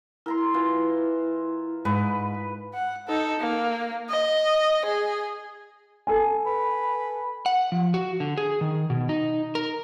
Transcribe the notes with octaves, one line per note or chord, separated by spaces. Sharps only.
E4 A#4 A#5 C6
E3 F4
G#2 B4
F#5
D#4 A4
A#3
D#5
G#4
A4 G#5
B4
F#5
F3
F#4
D3
G#4
D#3
B2
D#4
A#4